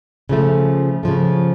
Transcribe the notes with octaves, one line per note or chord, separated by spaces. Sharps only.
C#3 F3 A3
C#3 F3 A3